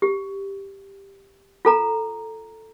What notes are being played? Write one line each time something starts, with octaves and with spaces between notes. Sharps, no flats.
G4
F4 A4 A#5